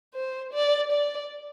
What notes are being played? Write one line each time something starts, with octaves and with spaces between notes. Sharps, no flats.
C5
D5
D5